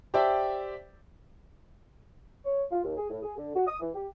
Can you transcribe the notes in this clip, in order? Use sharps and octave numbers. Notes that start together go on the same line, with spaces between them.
G4 C5 D5 E5 G5 A5
C#5
F4
D#2
G#4
A2
G#4
D3
F#4
D#6
E3
G4